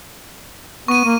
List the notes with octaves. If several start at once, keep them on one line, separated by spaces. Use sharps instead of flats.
B3 C#6 D#7
A#3